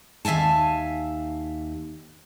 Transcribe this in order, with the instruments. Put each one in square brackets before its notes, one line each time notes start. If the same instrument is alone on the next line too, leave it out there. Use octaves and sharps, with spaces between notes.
[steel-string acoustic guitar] D#2 E5 F5 G#5 A5